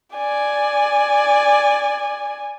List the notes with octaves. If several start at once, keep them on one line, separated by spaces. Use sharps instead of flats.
D5 G#5